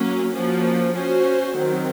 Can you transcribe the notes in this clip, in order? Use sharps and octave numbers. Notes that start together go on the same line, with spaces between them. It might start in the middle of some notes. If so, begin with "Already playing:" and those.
Already playing: F#3 A#3 C#4
F3 A#3 C#4 F#4
C#4 F#4 C5
D#3 F#3 C4